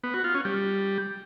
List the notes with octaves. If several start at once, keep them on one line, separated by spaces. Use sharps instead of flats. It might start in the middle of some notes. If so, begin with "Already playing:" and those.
B3
F#4
F4
C#4
G3